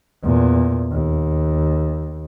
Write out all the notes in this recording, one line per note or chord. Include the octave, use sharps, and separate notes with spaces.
E2 A#2
D#2